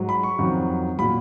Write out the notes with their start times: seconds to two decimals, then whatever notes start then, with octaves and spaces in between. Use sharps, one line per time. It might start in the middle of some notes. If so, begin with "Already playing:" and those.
Already playing: G#2 F#3
0.09 B5
0.23 C#6
0.39 F2 D#3 F#3
0.98 F#3 B5
1.02 A#2